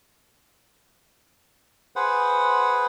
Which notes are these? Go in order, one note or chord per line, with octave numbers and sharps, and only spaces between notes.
G#4 B4 C5 F#5